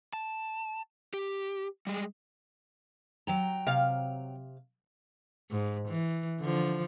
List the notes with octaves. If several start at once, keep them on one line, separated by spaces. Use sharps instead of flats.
A5
G4
G3 G#3
F#3 G5 A#5
C3 F5
G#2
E3
D3 F3